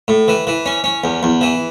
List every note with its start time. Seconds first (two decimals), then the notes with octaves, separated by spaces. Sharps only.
0.08 A2
0.28 E3
0.47 E3
0.66 C#4
0.84 C#4
1.04 E2
1.23 E2
1.41 E3